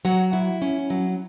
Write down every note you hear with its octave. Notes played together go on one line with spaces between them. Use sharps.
F#3 F#4 F#5
E4
C#4
F#3